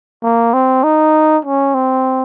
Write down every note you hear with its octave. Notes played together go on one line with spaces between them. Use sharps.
A#3
C4
D#4
C#4
C4